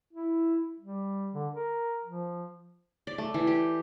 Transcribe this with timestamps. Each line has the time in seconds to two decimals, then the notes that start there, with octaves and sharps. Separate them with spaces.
0.13 E4
0.80 G3
1.34 D3
1.53 A#4
2.05 F3
3.07 D5
3.18 A3
3.34 E3
3.47 G4